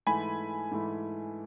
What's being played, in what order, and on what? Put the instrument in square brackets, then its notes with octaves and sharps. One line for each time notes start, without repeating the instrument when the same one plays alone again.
[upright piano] G#2 E3 A3 [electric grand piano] G#5 B5
[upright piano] G#2 E3 A3